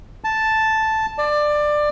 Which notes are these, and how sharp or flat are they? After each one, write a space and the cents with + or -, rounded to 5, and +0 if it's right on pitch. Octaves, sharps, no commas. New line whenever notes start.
A5 +0
D5 +20